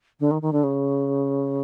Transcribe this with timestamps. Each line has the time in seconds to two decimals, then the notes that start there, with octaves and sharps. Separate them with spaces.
0.20 D3
0.31 D#3
0.42 D#3
0.53 D3
0.64 C#3